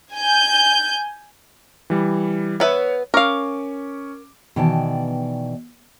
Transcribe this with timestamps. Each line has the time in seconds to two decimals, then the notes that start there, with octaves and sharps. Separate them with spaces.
0.14 G#5 G6
1.90 E3 G3
2.60 B3 B4 C#5 E5
3.14 C#4 A#4 F5 C#6 D6
4.56 B2 D#3 E3 D5 G5 A5